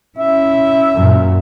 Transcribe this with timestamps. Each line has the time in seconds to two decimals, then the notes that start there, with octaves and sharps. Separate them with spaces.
0.18 C#4 E4 E5
0.93 F#2 A#2